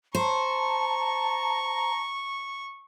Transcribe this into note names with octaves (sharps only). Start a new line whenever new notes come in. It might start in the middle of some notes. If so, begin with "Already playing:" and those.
C5 A5 A#5 C#6